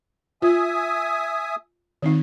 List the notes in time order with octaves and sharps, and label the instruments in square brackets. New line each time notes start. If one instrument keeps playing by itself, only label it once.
[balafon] F4 [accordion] E5 G#5 D#6
[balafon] D#3 C4 D#4